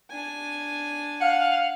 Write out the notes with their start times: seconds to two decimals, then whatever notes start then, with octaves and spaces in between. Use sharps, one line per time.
0.10 D4 G#5
1.21 F5 F#5